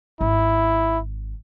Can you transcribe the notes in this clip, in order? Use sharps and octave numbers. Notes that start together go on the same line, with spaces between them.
G#1 E4